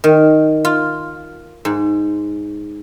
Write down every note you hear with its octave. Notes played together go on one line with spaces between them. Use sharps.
D#3
F4
G#2